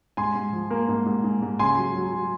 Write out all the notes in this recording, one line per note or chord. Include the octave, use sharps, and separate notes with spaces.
G#2 G#5 C6
G#2
F3
A#3
G#2
G#2
G#2
G#2
C#3 G#5 C6
F#3
F#3
F#3